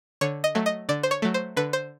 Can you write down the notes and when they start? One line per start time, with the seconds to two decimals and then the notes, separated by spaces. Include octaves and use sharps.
0.21 D3 C#5
0.44 D#5
0.55 F#3 A3
0.66 D#5
0.89 D3 D5
1.03 C5
1.11 C#5
1.22 F#3 A3
1.34 C5
1.57 D3 B4
1.73 C5